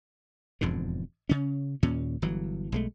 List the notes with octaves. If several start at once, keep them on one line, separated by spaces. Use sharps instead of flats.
E1 F2 G#2 D3
C#3 C#4
D#2 A#2 C#4
G1 E3 F#3
B1 G#3 A3